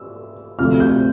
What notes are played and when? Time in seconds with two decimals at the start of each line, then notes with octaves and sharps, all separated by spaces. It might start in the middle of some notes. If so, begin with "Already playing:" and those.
Already playing: E6
0.59 D2 C3 F3 F6
0.80 G6